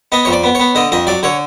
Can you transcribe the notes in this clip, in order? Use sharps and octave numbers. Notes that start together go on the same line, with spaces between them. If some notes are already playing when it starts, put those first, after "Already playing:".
B3 D#5
F2 C#5
D5
B3
B3 C#5
D3 D#5
F2 D#5
F#3 D5
D3 C#5